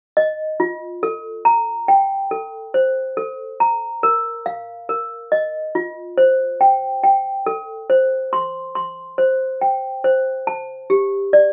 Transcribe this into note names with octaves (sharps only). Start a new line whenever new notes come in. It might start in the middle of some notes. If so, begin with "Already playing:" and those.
D#5
F4
A4
A#5
G5
A4
C5
A4
A#5
A#4
F5
A#4
D#5
F4
C5
G5
G5
A4
C5
C6
C6
C5
G5
C5
A5
G4
D5